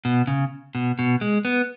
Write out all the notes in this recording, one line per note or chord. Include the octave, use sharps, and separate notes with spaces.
B2
C#3
B2
B2
G#3
B3